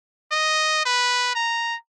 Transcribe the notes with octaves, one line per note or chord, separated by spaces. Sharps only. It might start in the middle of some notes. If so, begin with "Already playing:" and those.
D#5
B4
A#5